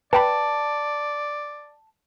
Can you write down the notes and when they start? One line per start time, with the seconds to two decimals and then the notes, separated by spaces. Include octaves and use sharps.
0.13 B4 D5 G5 A5 B5